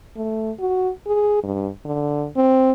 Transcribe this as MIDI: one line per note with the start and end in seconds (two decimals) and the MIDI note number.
0.16 0.51 57
0.59 0.90 66
1.06 1.38 68
1.43 1.69 43
1.85 2.27 50
2.36 2.72 60